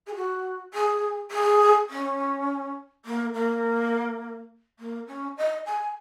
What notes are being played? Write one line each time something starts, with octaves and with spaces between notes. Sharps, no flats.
G#4
F#4
G#4
G#4
C#4
A#3
A#3
A#3
C#4
D#5
G#5